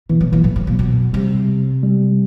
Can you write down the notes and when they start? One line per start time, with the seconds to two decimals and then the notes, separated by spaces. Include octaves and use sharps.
0.09 B2 E3
0.20 B2 F#3
0.32 A#2 E3
0.44 A2 F#3
0.56 A2
0.67 A#2
0.79 B2
1.13 C3 G3
1.83 G3